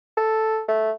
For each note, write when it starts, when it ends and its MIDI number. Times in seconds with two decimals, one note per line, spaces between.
0.17 0.62 69
0.68 0.91 57